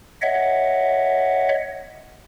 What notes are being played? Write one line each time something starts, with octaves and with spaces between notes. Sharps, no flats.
C#5 D#5 E5 F#5